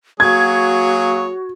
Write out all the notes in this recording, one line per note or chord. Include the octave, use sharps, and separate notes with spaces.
F#3 A#3 F#4 G#4 C#5 G#6